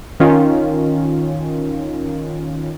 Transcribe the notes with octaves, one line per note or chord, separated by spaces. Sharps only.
D#3 C#4 F4